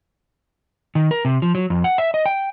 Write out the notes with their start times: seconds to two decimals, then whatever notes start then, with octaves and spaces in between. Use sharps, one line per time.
0.95 D#3
1.11 A#4
1.25 C3
1.42 F3
1.55 F#3
1.70 F2
1.84 F#5
1.98 E5
2.14 D#5
2.26 G5